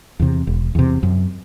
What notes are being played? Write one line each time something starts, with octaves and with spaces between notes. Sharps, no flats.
E2 C3
E1
E2 C3
F#2